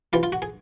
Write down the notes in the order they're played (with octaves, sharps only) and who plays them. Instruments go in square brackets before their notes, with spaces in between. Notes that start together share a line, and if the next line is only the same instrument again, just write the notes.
[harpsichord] C3 E3 F4
F4
F#4
G#4